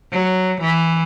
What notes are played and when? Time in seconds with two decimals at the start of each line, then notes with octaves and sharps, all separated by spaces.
0.12 F#3
0.61 E3